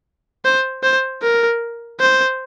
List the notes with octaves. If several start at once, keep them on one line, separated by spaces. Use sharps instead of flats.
C5
C5
A#4
C5